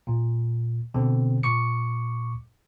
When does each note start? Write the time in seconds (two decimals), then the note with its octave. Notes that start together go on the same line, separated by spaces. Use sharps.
0.07 A#2
0.94 B2 D3 C4
1.43 A#2 C#6 D6 C#7